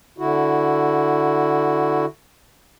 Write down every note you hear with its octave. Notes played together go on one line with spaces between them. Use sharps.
D3 E4 F#4